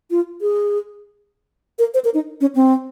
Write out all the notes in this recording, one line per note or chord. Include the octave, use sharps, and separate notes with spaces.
F4
G#4
A#4
C5
A#4
D#4
C#4
C4